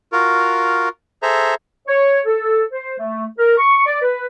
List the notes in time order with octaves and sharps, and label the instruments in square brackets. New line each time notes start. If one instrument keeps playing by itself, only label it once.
[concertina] F4 F#4 A#4
G#4 A4 C5 E5 A#5
[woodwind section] C#5
A4
C5
A3
A#4
C#6
D5
B4